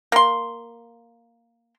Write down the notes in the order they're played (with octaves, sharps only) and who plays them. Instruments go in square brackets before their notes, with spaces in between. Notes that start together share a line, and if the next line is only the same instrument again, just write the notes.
[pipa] A#3 C6